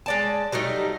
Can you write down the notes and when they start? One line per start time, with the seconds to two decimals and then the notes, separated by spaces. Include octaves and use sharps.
0.06 G#3 D5 A5
0.52 F#3 G3 A3 D#4